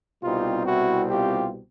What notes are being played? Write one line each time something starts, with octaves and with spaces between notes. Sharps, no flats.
C2 B2 G3 C4 D#4 F4
E4 F#4
F4 G4